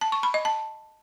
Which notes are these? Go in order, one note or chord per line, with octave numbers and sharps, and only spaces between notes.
A5
C#6
B5
D#5
A5